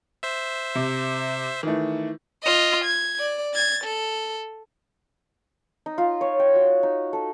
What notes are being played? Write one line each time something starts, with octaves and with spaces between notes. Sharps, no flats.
C5 E5
C3
D#3 E3 A3
F4 D#5
G#6
D5
G#6 A6
A4
D#4
F4
C#5
G5
F#4
D#4
A4